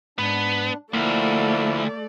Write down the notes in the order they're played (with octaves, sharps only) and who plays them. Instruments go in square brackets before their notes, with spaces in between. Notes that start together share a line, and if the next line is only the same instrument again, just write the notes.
[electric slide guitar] G#2 [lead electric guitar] B3 [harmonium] D4
[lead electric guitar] D2 [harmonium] F3 E4 F5 [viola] A3 D5 [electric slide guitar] A#3